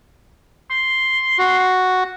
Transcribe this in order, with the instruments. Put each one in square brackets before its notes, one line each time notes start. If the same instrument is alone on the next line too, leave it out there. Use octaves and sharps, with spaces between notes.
[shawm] C6
[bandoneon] F#4